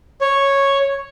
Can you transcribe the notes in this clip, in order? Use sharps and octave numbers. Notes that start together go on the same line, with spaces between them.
C#5